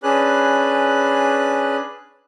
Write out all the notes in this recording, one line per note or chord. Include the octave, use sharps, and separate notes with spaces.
C#4 D4 G#4 B4 F#6